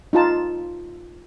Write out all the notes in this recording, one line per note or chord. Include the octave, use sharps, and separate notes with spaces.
D#4 F4 A5